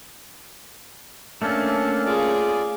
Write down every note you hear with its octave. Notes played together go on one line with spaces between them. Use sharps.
A3 A#3 C#4 D4 A4
F4 G#4 D5